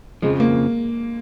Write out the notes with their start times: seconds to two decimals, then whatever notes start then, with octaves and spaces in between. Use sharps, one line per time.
0.22 F2 C#3 F3 G#3
0.40 A#3